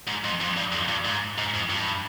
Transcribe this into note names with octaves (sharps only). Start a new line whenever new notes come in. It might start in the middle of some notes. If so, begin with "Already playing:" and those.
G#2
F2
F2
G2
F2
G2
G#2
G#2
F2
G2